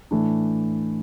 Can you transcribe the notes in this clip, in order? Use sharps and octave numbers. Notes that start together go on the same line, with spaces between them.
A2 E3 A3 D4